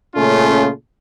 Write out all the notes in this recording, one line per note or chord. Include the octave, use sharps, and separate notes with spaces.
A#2 C#3 A3 C#4 F4